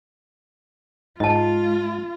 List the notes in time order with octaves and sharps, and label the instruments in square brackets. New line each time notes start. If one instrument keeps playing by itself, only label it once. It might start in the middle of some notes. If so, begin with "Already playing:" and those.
[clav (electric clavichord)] G#2 [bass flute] G#3 [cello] F4 [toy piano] D#5 A5